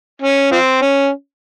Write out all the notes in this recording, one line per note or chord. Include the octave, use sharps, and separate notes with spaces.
C#4
F3 C4
C#4